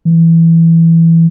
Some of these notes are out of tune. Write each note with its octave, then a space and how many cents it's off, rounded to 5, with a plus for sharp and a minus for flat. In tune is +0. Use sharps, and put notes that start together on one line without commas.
E3 +5